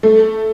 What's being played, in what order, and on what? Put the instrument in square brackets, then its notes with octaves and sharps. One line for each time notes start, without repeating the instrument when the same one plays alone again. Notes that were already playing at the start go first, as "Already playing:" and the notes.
[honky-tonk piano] A3